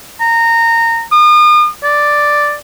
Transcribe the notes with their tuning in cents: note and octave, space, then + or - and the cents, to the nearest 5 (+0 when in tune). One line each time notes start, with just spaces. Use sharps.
A#5 -20
D#6 -40
D5 +0